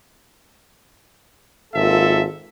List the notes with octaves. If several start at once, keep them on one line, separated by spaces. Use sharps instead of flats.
G#1 A#3 F4 A4 E5